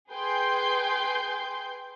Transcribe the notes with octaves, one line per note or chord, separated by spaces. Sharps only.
G#4 B4 G5 C6 G6